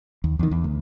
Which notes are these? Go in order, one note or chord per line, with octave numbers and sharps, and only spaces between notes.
D#2
E2 D#3
E2
D2